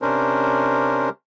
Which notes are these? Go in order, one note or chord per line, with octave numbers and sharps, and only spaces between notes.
C3 C#4 D4 A#4 C5